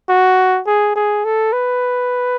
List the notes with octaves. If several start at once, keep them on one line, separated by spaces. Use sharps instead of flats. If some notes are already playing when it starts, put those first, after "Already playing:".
F#4
G#4
G#4
A4
B4